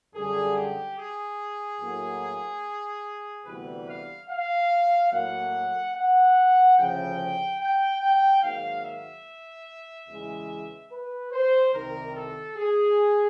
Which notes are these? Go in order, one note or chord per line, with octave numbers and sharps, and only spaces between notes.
F#2 D3 G3 G#4
G4
G#4
A2 F#3 A#3
D2 C3 E3 G3 B3 B4
F5
F5
A2 F#3 A#3 F#5
F#5
D2 C#3 F3 G5
G5
G5
G#2 D#3 F#3 A#3 F5
E5
E2 C#3 E3 G#3
B4
C5
C2 C3 D#3 A#4
A4
G#4